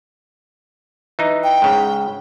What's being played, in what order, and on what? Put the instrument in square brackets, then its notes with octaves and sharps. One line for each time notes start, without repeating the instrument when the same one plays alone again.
[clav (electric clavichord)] E3 D#4
[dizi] G5
[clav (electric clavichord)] G#2 C#3